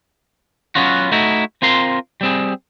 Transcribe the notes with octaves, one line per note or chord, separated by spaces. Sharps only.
F#3 G#3 B3 C#4 F4 F#4
A3 D#4 E4 F#4
C4 F4 A#4 C6
G3 C4 G#4